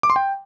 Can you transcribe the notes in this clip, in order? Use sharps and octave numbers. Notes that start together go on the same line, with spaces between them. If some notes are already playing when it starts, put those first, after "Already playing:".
D6
C6
G5